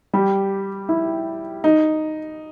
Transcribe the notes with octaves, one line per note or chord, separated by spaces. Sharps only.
G3 G4
E4
D#4